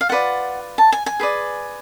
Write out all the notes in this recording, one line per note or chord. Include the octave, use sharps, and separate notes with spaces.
F5
F4 B4 D5 F#5
A5
G#5
G#5
G#4 B4 D5